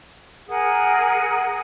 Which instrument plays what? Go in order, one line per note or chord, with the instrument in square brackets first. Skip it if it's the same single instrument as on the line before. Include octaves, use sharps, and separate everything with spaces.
[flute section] G#4 A#4 F#5 G#5